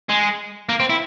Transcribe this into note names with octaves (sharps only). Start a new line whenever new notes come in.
G#3
A#3
C4
E4